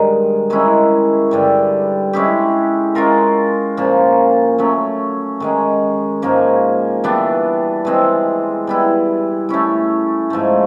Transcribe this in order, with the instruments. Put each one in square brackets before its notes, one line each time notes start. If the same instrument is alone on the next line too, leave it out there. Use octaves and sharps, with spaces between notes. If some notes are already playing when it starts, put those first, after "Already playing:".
Already playing: [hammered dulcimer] G2 D#3 G#3
D#3 G#3 C#4 E4
G2 D3 G3
G#3 C#4 E4 G4
G#3 C#4 F4 A#4
A#2 F3 A#3 C#4
F#3 A3 C#4
D#3 G#3 C#4
G#2 F3 A#3 C#4
E3 G3 B3 D4
E3 G#3 C4
G3 B3 E4
A3 C#4 E4
G#2 F3 A3